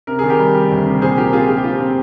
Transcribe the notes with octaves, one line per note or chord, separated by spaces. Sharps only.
C3 A#4
D#3 G#4
G4 A#4
G3
G3
D2
C3
A#2 G#4 C5
F3 G4 A#4
C4 F4 G#4
F3 G#4
G4
F3 F4
G4
C4